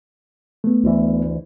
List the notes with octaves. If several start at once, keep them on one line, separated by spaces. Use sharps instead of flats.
A3 B3
D2 E3